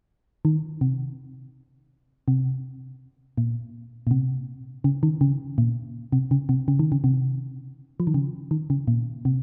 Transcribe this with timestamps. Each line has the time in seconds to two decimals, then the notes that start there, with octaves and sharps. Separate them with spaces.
0.45 D#3
0.81 C3
2.28 C3
3.38 A#2
4.07 A#2
4.11 C3
4.84 C#3
5.03 D#3
5.21 C#3
5.58 A#2
6.12 C3
6.31 C#3
6.49 C3
6.68 C#3
6.79 D#3
6.92 C#3
7.04 C3
8.00 F3
8.07 D#3
8.14 C#3
8.51 D#3
8.70 C#3
8.88 A#2
9.25 C3